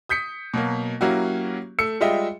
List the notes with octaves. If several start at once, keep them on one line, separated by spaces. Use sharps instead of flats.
D#6 G6 B6 C#7
B2 F#3 A#3
F#3 A#3 C#4 E4 F#4 G4
A3 E6 C#7
G3 G#3 F4 D#5 E5 G5